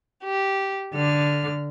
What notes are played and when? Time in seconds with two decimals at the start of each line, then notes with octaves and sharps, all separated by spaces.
0.24 G4
0.96 D3 F6